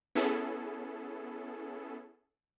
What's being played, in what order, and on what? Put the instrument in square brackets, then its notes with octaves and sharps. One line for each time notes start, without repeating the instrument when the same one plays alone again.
[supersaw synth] B3 C#4 E4 G#4 A4